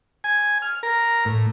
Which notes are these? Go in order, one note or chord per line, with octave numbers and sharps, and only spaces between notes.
G#5
F6
A#4
A2